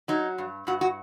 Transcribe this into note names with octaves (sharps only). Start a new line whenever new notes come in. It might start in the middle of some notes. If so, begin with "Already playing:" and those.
F#3 D#4
G2
G2 F#4
F#4